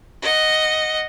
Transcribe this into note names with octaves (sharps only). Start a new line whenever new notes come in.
D#5 F#5